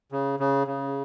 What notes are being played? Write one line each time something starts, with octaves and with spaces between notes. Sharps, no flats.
C#3
C#3
C#3